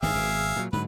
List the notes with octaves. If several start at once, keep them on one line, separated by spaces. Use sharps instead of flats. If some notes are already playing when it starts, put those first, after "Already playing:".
G#1 G2 D#3 G#4 E5 F5
G#1 B2
A#2 F#3
G#2 D3 F#3 B4